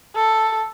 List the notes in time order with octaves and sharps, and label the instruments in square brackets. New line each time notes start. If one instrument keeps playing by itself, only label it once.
[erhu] A4